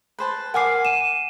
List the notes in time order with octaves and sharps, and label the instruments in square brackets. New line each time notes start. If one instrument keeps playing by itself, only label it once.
[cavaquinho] B4 C5 A5
[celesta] A#4 F6 C7 [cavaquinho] F#5 G#5 D6
[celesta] D#7 E7